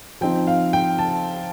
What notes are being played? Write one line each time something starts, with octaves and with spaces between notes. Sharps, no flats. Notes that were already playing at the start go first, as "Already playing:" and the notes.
F3 C4 D#4 G5
F5
G5
A5